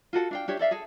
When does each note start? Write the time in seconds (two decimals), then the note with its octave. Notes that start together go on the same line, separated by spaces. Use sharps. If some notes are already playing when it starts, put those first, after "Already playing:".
0.13 F4 F#4 A4 F#5
0.31 D4 F5 G5
0.48 D4 G4 C#5 E5
0.59 A4 D5 E5 F5
0.71 G#4 A4